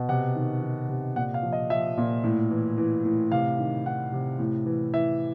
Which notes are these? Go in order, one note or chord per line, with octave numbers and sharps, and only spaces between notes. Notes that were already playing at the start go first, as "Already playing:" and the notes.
Already playing: B2
C3 F#5
D#3
D#3
C3
A#2 F#5
F5
F3
D#5
F3 E5
A#2
A2
E3
E3
A2
C3 F5
D#3
D#3 F#5
C3
A2
E3
E3 E5